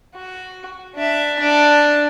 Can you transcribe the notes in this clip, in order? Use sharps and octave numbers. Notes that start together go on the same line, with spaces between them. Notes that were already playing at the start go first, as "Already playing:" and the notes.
F#4
D4 E5
D4